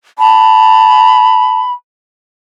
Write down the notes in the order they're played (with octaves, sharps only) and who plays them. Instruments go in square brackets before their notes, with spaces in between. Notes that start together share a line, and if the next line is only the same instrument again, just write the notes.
[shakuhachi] A5 [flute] B5